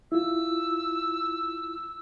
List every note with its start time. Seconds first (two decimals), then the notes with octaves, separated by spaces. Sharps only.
0.12 E4 F4 E6